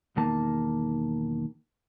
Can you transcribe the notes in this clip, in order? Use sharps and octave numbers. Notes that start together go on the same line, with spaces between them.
B1 E2 D#3 A#3 A5